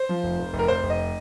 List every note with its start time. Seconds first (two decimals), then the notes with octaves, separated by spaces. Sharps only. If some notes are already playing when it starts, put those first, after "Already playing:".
Already playing: C5
0.09 F3
0.23 F1
0.39 F1
0.53 F1
0.59 A#4
0.68 F1 C5
0.83 F1
0.90 D#5